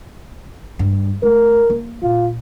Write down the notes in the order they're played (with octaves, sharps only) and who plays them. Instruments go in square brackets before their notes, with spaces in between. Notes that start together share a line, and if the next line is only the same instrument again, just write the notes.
[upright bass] G2
[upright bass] A3 [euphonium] A#4
[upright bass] A#3
[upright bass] A#2 [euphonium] F4